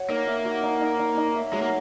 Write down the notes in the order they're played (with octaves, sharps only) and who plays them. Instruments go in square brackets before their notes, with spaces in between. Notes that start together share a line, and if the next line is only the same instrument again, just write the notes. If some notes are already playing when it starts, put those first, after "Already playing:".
Already playing: [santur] F#4 C#5
[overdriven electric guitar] A#3 [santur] D#4
[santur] E5
F#4
D#4
D#4
D#4
D#4
E5
[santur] F#3 [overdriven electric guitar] G#3
[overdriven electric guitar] A#3